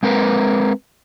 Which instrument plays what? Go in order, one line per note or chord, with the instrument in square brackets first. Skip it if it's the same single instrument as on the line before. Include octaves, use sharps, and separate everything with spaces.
[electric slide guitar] G#3 C4 A#4 B4